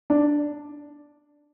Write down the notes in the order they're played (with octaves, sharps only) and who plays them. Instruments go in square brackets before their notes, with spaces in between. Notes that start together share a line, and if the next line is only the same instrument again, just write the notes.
[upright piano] D4